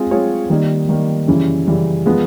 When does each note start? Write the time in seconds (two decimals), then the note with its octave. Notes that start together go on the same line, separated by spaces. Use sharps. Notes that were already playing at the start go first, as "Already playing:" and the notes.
Already playing: G#3 C4 F4 G#4
0.11 G#3 C4 F4 G#4 C#5
0.50 D#3 G3 A#3 D#4
0.89 D#3 G3 A#3 D#4
1.27 F#2 C#3 E3 G3
1.67 F#2 C#3 E3 G3
2.06 F3 G#3 B3